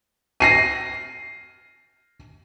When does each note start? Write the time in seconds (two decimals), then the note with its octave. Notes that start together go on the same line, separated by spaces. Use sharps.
0.40 A#6 C7 D#7